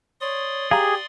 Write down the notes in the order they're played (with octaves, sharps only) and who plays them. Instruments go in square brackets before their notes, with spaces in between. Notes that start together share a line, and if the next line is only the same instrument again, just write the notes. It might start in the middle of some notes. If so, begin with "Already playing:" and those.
[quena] C#5 [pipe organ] D5 C6 D#6
[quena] G4 [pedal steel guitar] G#4 [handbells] F5 A#5